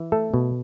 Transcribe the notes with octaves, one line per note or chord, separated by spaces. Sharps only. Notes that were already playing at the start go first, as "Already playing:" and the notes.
Already playing: E3
A3 A4
B2